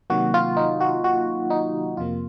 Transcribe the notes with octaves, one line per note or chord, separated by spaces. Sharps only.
C3 D#3 F#3 A#3 F#4
F4
D#4
F#4
F#4
D#4
F2 C3 F3 A#3 F4